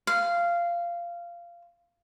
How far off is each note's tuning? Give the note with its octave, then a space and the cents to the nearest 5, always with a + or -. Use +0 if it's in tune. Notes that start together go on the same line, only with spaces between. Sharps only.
F5 -15